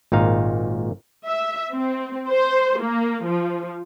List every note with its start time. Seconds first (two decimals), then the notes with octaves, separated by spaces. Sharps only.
0.12 G#1 A#2 D#4 F5
1.28 E5
1.74 C4
2.29 C5
2.81 A#3
3.25 F3